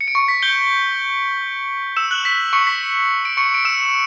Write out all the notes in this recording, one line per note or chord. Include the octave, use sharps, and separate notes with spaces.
C#7
D7
C#6 C#7
B6
G6 G7
E6 E7
F#6 F#7
B6
C#6 C#7
B6
D7
C#6 C#7
D7
E6 E7